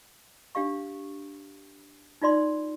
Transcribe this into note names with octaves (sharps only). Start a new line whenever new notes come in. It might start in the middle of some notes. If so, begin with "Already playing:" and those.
D4 G4 F5 C#6
D#4 F4 D5 C6